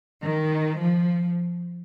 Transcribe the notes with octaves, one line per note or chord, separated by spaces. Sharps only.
D#3
F3